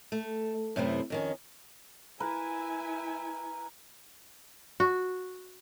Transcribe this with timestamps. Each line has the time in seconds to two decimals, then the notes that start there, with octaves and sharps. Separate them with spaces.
0.12 A3
0.76 F#2 C3 A3 B3 C4 E4
1.10 F2 D#3 C#4
2.20 E4 A#4 B4 G#5
4.80 F#4